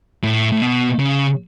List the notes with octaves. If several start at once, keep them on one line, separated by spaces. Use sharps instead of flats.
A2
A2
B2
C#3